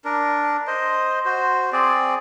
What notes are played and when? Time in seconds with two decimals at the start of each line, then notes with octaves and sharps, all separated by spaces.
0.05 D4 A#4
0.67 C5 D#5
1.25 F#4 C5
1.72 C4 G#4 D5